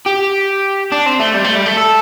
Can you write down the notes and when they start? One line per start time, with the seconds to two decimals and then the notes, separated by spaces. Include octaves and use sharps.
0.06 G4
0.92 D4
1.06 C4
1.20 A3
1.34 G3
1.44 A3
1.55 G3
1.66 A3
1.77 A4